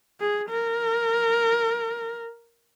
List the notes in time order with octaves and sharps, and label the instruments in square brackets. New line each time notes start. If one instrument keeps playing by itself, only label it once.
[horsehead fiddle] G#4
A#4